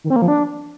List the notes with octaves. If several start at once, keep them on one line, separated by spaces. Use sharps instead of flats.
D#3
C4
A#3
F3
D4